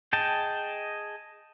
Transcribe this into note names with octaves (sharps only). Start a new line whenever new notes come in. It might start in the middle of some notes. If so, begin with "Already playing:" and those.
G#4 D#5 G5 A5